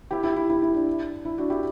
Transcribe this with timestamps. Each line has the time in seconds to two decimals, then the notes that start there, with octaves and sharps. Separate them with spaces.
0.11 E4 G4
0.24 E4
0.36 E4
0.50 E4
0.62 E4
0.75 D4
1.25 E4
1.38 D4 F#4
1.50 E4 G4